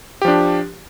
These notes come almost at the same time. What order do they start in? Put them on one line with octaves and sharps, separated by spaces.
G4 F3 D4